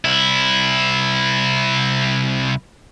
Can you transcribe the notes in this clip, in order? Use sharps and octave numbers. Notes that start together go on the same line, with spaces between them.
C2 E4